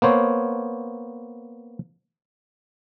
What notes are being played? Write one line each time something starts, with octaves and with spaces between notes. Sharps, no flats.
A#3 B3 C5 C#5